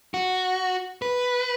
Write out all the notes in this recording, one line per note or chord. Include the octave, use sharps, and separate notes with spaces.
F#4
B4